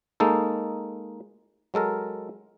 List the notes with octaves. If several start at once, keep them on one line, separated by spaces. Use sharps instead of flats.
G#3 A#3 D#4 A4
F#3 G#3 A4 A#4